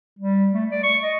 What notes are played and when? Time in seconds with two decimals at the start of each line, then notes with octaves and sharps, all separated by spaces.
0.19 G3
0.53 A3
0.71 D5
0.83 C#6
1.03 D#5